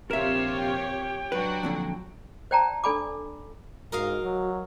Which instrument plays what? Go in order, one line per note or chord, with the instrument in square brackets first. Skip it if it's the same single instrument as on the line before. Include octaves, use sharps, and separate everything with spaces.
[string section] A#1 C3 F4 [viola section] G4 C#5 [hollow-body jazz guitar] A#4 E5 [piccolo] E7
[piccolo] G5
[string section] F#3 D4 F#4 [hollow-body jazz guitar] B4
[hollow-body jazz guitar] F2 A#2 D3
[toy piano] C5 D5 G5 A5 A#5
D4 A4 D5 G#5 B5 D6
[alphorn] G#2 [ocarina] F#4 [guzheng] A#4 D#5 F5
[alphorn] F#3